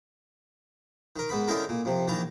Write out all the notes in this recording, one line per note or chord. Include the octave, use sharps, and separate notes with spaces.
D#3 A#4
G#2 B3 B5
D3 C#4 D#4 E4 A4 A#4
A#2
F2 C3
A#1 D#3 E3 A5 A#5